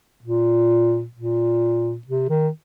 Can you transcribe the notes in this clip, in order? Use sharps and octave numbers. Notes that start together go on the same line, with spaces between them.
A#2
A#2
C3
D#3